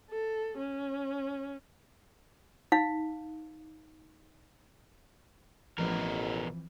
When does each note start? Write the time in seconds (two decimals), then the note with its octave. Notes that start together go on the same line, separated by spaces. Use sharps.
0.10 A4
0.58 C#4
2.72 D#4 F5
5.78 A1 B2 E3 F3 C4 A#4